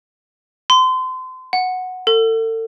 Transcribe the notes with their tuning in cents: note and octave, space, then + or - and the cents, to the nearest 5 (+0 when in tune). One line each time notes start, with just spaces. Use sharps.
C6 -30
F#5 -5
A4 +35